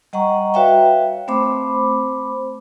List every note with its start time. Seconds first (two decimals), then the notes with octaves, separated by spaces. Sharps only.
0.13 G3 D#5 F#5 A#5 C#6
0.54 F#4 B4 C#5 E5 F5 G5
1.28 A3 C4 C5 B5 D6